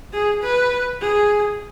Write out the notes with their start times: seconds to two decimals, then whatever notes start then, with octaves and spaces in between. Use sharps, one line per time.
0.14 G#4
0.43 B4
1.01 G#4